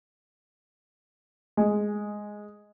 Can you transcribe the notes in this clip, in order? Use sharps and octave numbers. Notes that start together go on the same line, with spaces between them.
G#3